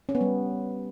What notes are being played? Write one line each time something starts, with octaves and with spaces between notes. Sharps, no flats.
C#4
B3
G3